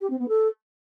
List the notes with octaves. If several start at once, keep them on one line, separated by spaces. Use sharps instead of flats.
G4
C4
B3
A4